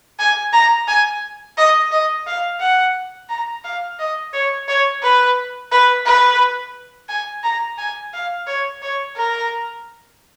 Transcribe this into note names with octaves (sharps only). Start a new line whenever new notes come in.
G#5
A#5
G#5
D#5
D#5
F5
F#5
A#5
F5
D#5
C#5
C#5
B4
B4
B4
G#5
A#5
G#5
F5
C#5
C#5
A#4